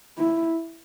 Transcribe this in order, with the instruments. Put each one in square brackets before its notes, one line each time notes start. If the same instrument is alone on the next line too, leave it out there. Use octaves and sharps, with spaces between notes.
[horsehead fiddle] E4